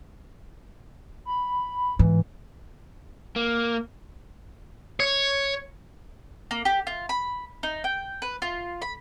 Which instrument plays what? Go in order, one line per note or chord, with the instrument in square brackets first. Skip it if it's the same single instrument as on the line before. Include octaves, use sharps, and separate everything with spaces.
[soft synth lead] B5
[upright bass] G#2 [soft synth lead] E3
[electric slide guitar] A#3
[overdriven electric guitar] C#5
[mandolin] A#3
G4
F4
B5
D#4
G5
B4
F4
B5